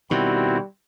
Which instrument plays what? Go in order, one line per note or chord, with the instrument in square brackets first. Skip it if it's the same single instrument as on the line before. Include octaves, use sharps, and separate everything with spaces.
[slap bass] B2 D#3 [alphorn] G3 [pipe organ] C4 E4 F#4